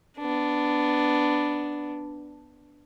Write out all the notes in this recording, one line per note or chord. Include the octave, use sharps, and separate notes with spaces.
B3 D4